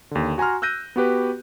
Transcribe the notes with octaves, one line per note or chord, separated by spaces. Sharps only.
D#2 D3
F#4 G#5 A#5 C6 F6
E6 F#6 G6 A#6 D#7
B3 F#4 G4 B4